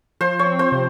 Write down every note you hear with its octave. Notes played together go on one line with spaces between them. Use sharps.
F3 C5
C#5
C4
C5
C3